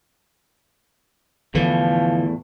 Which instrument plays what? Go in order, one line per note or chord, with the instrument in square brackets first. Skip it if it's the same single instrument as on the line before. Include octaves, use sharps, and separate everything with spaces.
[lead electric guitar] E2 A2 [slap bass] D3 E3 [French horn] F3